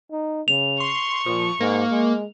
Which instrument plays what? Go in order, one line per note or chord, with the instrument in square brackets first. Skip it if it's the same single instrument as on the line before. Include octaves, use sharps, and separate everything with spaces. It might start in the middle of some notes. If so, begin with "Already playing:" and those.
[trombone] D#4
[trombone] C#3 [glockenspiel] F7
[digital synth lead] C6 [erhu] C#6
[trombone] A#2 [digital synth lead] F3
[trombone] G#2 [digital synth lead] A#3
[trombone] G#3